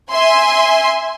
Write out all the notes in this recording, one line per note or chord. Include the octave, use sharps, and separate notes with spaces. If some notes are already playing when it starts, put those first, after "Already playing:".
E5 G#5 C6